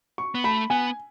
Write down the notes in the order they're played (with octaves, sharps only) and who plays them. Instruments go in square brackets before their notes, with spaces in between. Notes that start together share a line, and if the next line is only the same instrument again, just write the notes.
[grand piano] C#6
[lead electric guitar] B3
[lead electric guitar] A3 [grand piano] B5
[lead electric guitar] B3 [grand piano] G#5